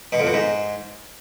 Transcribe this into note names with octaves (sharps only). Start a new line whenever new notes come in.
B2
F2
B2
G#2